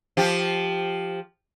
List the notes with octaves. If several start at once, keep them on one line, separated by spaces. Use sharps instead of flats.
F3 G4